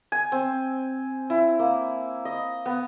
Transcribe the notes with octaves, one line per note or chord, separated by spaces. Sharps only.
G#5
C4
E4
A#3
D#5
B3